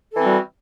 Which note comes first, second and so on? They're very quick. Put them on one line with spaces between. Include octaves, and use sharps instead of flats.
A4 E3 C4 F#4 G3